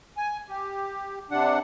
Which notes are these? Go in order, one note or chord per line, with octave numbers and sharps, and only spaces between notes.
G#5
G4
C3 D4 F#5